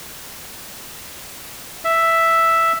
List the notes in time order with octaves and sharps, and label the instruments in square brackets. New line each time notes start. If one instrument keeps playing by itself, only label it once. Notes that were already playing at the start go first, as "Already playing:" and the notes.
[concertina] E5